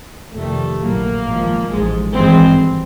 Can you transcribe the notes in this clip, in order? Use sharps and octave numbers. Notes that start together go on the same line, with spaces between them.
F2 C3 D#3 G3 A3
A#1 A2 F#3 A#3
G#1 G#2 F3
A1 G#2 F3 G#3
G#1 G2 E3 G#3 C4